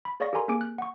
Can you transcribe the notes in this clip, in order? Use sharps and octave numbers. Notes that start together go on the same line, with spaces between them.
B5
G#4 C#5 D5 F5 C#6 A#6
G4 A4 A#4 G#5 A#5 C6
A#3 C4 G#4 G#5 D6 D7
F#6
F#5 C#6